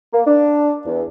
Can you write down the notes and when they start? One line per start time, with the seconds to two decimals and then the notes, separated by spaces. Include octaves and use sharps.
0.13 A#3
0.27 D4
0.86 E2